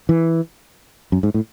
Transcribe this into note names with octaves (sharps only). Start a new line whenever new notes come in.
E3
F#2
G#2
A2